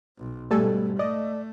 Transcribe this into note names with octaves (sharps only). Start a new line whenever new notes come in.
B1
G#2 B2 G3 A3 A4 G#5
A3 D5 D#5